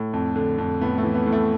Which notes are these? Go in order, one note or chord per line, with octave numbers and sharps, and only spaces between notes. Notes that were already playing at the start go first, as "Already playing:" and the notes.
Already playing: A2
F2
D3
F2
A2 B3
A3
E3
B3
A2
A3